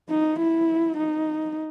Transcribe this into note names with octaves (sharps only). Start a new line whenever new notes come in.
D#4
E4
D#4